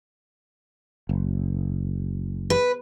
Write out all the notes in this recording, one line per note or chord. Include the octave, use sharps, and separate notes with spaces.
F#1
B4